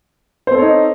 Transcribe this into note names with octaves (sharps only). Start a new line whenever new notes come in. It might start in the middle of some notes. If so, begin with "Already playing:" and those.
C4 D#4 A4 C5 C#5